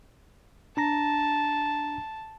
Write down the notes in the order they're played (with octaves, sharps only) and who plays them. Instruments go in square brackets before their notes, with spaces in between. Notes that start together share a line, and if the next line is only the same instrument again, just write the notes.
[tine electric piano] D4 A#5 A#6 [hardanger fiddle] A5